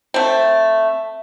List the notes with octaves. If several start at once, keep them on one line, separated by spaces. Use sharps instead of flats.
A3 C4